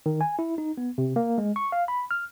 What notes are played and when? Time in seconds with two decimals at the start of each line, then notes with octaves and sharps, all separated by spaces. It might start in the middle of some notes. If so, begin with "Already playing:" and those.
0.06 D#3
0.21 G#5
0.39 E4
0.58 D#4
0.78 B3
0.98 C3
1.16 A#3
1.38 G#3
1.56 C#6
1.72 F5
1.88 B5
2.11 F6